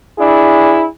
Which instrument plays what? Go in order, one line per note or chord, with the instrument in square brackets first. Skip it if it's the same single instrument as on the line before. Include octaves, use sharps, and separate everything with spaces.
[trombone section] D4 E4 G#4